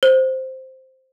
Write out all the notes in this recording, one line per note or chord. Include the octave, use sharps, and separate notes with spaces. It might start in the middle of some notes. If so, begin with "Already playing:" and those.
C5